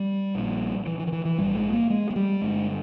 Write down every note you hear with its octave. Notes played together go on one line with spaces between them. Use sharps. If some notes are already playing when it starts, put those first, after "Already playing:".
Already playing: G3
A#1 A#2
E3
E3
D#3
E3
E3
A#1 G#2 G3
G#3
A#3
G#3
G#3
G3
G1 G2 G#3